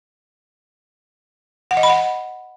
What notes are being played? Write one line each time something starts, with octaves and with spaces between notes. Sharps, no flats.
F#5
D#5
B5
F#5